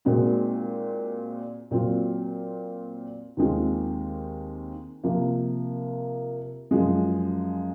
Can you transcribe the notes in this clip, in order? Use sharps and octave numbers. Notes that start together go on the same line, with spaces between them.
A#2 G#3 C4 D#4 F#4
A#2 F#3 C4 F4
D#2 D#3 G#3 C4 F4
C3 F3 A#3
F#2 F3 G#3